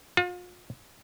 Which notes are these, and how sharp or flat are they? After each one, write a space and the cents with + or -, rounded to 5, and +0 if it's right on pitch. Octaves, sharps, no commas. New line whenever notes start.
F4 +40